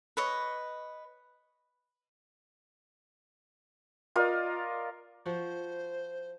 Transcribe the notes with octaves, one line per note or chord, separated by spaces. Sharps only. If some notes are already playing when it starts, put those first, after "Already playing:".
B4 C#5 D#5
F4 A#4 D5 D#5
F3 F#4 C5